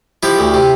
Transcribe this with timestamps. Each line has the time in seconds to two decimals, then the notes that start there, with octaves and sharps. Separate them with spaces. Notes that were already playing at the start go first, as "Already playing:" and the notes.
0.23 F3 E4 G4
0.39 D2
0.54 C3